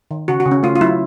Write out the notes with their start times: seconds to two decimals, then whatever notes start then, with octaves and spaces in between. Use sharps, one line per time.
0.11 D#3
0.28 C#3 F#4
0.40 F#4
0.46 C#3
0.51 C#4
0.63 A3 F4
0.76 F4
0.81 F#3 E4